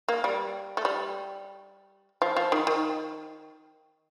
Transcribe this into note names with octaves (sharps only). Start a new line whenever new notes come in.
A#3
G3
A3
G3
F3
F3
D#3
D#3